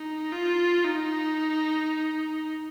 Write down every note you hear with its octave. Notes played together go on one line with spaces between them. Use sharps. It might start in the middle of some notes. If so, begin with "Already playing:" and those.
Already playing: D#4
F4
D#4